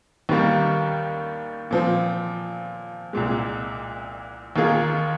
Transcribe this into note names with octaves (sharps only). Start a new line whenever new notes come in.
D#2 D#3 G3 A#3
A#2 F3 C4
C2 A#2 G#3
D#2 D#3 A#3 F4 G#4